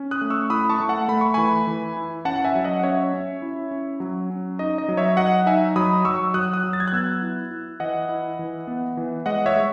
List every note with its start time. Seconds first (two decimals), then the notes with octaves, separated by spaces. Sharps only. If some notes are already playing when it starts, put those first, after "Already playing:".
Already playing: C#4
0.11 D#6 F#6
0.21 A3
0.30 C#6 E6
0.50 E4 B5 D#6
0.69 A5 C#6
0.80 A3
0.89 F#5 A5
1.08 A3 B5
1.21 C#6
1.34 E3 G#5 B5
1.67 E3
1.97 E4
2.25 C#4 F#5 A5
2.36 A5
2.45 E5 G#5
2.55 F#3
2.64 D#5 F#5
2.80 F#5
2.83 C#4 C#5 E5
3.14 C#4
3.42 E4
3.71 C#4
4.00 F#3
4.30 C#4
4.59 D#4 D#5
4.78 D#5
4.88 F#3
4.97 C#5 E5
5.17 F#3 D#5 F#5
5.46 D#4 E5 G#5
5.76 F#3 B5 D#6
6.05 F#3 C#6 E6
6.34 F#3 D#6 F#6
6.53 D#6 F#6
6.64 F#3
6.73 A6
6.80 G#6
6.88 F#6
6.92 B3 E6 G#6
7.22 E4
7.51 E4
7.80 E3 D#5 F#5
8.09 E4
8.39 E3
8.67 B3
8.97 E3
9.26 G#3 D#5 F#5
9.46 C#5 E5
9.56 G#3